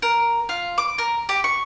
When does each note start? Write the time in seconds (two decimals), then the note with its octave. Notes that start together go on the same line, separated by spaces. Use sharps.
0.02 A#4
0.49 F4
0.78 D6
0.98 A#4
1.29 G4
1.44 C#6